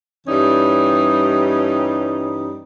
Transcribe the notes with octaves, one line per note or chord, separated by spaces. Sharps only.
G2 E3 G3 C#4 D#4